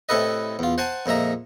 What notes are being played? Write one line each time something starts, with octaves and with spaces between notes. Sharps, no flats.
A2 C3 E4 A4 B4 D#5
E2 F4
C5 F#5 G#5 A5
F2 A#2 G#3 E5 A#5